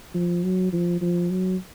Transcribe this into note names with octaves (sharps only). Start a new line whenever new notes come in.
F3
F#3
F3
F3
F#3